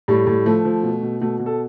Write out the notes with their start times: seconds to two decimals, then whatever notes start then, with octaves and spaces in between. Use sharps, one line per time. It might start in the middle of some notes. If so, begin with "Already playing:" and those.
0.08 A2 G3
0.27 A2
0.46 F3 A3
0.65 F3
0.83 B2
1.03 B2
1.21 B2 A3
1.39 B2
1.46 A4